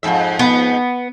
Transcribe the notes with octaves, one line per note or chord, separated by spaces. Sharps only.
F2 G#2 E5
B3